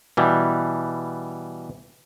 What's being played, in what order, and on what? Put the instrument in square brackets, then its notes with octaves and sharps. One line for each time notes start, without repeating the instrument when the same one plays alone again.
[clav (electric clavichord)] B2 E3 G3